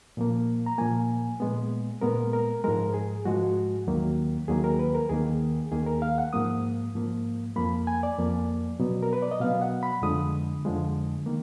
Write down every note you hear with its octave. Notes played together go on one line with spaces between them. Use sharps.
A#2 F3 A#3
A#5
A#2 F3 A#3 G#5
A#2 G#3 B3
A#2 G#3 B3 A#4
A#4
G#2 F3 G#3 A#4
G#4
G#2 F3 G#3 F#4
D#2 D#3 F#3 A#3
D#2 D#3 F#3 A#3 G#4
A#4
B4
A#4
D#2 D#3 A#3 G#4
D#2 D#3 A#3 G#4
A#4
F5
F#5
G#2 F3 A#3 D#6
G#2 F3 A#3
F2 F3 A#3 B5
G#5
D5
F2 F3 A#3
B2 F#3 B3
A#4
B4
D5
D#5
B2 F#3 B3 F5
F#5
B5
F2 D3 F3 G#3 D#6
F2 D3 F3 G#3
D#3 A#3